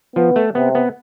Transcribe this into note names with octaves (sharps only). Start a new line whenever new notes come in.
F3 B3
A3
C3 B3
B3